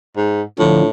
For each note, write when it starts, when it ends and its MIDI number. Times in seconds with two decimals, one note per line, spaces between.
0.17 0.42 44
0.59 0.90 45
0.59 0.82 50
0.59 0.82 53